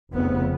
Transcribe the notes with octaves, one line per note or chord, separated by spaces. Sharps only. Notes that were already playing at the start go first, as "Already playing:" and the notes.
F1 F2 C#3 B3